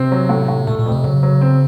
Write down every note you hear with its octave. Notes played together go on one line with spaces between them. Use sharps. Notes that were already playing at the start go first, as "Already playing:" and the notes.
Already playing: C3 C4
F#3
A2
A2
A#2 A3
A#2
F2
C3
C#3 F#3
F#3
C4